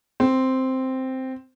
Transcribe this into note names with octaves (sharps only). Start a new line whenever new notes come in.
C4